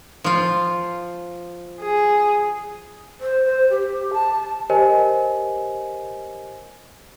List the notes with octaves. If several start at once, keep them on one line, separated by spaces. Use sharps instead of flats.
F3 F4
G#4
C5
C5
G4
A5
G4 A#4 C5 C#5 D#5 G#5